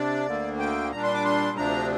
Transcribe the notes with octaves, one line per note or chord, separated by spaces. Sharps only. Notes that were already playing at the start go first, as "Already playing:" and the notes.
Already playing: C3 D4 D5
D2 D3 A#3
G5
A#2 G3 D4 A#5
C6
D6
C6
D2 C3 F3 D4 A#5